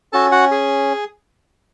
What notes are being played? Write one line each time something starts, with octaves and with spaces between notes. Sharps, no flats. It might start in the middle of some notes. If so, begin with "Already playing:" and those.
C#4 F#4 A4 A5
F#4 F#5
G#4